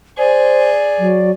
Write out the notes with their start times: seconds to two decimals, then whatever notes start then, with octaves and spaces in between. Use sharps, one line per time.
0.18 G#4 C5 D5
0.99 F#3